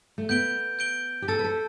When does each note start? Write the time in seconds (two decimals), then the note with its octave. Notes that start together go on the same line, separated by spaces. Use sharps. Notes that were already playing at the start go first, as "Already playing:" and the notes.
0.18 A3
0.29 B3 G6 D7 G7
0.79 G6 D7 G7
1.22 G4
1.28 A4 A5 E6 A6
1.39 B4
1.44 A4